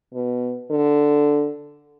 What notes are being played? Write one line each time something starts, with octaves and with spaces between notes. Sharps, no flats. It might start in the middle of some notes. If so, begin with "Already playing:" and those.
B2
D3